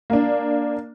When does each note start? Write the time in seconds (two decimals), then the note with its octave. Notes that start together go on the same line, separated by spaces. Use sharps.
0.10 A#3 D4